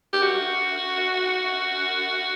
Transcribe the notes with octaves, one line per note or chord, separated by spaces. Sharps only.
G4
F#4